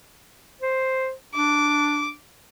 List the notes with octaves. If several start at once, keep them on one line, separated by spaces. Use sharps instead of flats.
C5
D4 D6